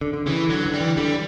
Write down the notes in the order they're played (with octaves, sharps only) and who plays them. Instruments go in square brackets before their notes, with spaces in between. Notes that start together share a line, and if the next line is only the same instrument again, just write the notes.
[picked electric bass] D3
D3
[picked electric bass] C#3 [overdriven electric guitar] E3
[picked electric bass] D3 [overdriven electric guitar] F#3
[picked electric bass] D3
[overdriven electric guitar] G3
[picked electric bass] E3
[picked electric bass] D3 [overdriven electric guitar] G3